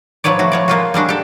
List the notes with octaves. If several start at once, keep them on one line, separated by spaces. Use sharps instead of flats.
F3 F#3 B4 C#5 D5
A3 F#4
F3 C#5 D5
G#3 A#3 F4 F#4
G3 G#3 D4 F#4
G4 A4